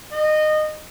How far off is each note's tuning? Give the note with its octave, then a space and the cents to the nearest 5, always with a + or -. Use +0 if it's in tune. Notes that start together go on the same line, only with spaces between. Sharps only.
D#5 -20